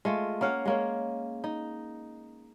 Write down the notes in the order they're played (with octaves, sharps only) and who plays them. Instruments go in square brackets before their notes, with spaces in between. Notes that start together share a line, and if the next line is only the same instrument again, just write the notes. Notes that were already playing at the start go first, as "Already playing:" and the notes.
[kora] G#3 A3 F4
A#3 C#4 F5 F#5
G#3 A#3 C#4
D#4